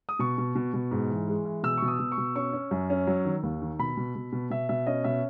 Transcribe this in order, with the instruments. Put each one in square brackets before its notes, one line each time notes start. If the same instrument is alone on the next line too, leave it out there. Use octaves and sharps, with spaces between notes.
[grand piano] D#6
B2 C#6
B2
B2
B2
G#2
E3
G#3
E3
B2 E6
B2 C#6
D#6
B2
C#6
B2
C#4 C#6
C#4
F#2
C#4
F#3
D#3
D#2
D#3
B2 B5
B2
B2
B2
B2 E5
B2 E5
C#4 D#5
B2 E5